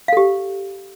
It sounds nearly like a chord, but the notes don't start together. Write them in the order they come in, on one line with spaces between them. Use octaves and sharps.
F5 A4 G4